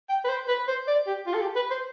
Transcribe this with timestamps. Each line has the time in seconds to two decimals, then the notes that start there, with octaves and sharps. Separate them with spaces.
0.09 G5
0.25 B4
0.29 C5
0.48 B4
0.68 C5
0.88 D5
1.07 G4
1.27 F4
1.34 A4
1.41 G4
1.56 B4
1.71 C5